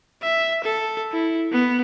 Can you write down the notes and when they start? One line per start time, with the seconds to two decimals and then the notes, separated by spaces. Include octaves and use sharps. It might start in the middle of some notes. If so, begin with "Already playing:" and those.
0.22 E5
0.64 A4
1.12 E4
1.52 B3